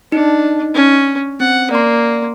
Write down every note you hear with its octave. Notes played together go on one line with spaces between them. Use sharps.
D4 D#4
C#4
C4 F#5
A#3 D5 C6